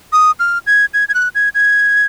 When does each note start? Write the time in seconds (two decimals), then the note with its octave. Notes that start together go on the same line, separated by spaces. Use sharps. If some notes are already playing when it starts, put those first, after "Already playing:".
0.12 D#6
0.40 F6
0.67 G#6
0.94 G#6
1.09 G#6
1.15 F#6
1.35 G#6
1.55 G#6